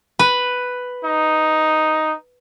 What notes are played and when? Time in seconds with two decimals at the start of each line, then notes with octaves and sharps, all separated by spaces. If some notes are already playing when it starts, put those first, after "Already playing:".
0.19 B4
1.05 D#4